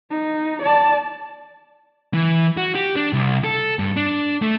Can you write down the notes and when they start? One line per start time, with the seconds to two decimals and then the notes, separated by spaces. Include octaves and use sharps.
0.10 D#4
0.62 D5 A5
2.14 E3
2.57 F#4
2.75 G4
2.96 D4
3.13 C2
3.44 A4
3.79 G2
3.96 D4
4.42 A3